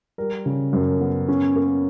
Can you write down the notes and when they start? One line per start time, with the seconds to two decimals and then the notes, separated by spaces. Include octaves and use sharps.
0.18 G3 A#4
0.46 C#3
0.73 F#2
1.01 B3
1.28 C#4
1.56 A#3